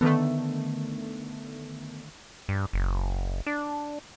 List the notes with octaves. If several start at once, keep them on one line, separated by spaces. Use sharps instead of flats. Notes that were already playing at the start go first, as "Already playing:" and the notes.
D3 D#3 A3 B3
G2
F#1
D4